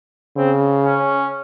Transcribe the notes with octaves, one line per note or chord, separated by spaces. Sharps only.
C#3 C4
C#4